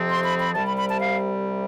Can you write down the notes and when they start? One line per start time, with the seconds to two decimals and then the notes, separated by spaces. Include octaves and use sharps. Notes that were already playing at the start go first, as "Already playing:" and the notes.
Already playing: F2 C3 F3 C4
0.09 C6
0.24 B5
0.39 B5
0.54 C2 C3 G3 A5
0.66 B5
0.76 B5
0.89 A5
0.99 F5